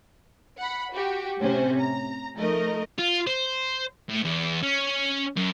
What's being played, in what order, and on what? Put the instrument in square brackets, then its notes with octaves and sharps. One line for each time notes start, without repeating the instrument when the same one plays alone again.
[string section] F#5 B5
F#4 G4
A2 C3 C#4 C5
A#5
F3 A3 D#4 A#4 D#5
[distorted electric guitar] F4
C5
A2
E2
C#4
F#2